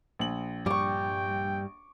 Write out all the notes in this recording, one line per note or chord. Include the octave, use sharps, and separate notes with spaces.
A#1 F#7
G2 G3 G5 C#6 D6